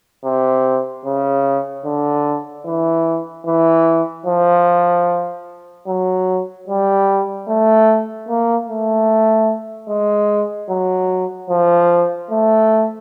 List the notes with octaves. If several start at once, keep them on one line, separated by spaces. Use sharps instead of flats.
C3
C#3
D3
E3
E3
F3
F#3
G3
A3
A#3
A3
G#3
F#3
F3
A3